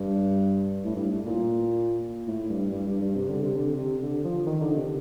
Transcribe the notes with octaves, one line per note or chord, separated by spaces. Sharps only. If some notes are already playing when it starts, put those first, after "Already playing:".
Already playing: G2
A2
G2
A2
A#2
A2
G2
G2
G2
G2
C3
D3
C3
D3
C3
D3
F3
D#3
D3
C3